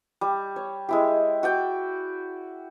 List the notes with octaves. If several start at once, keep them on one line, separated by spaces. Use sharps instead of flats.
G3
C#5
G#3 E4 G4
F#4 D5 G5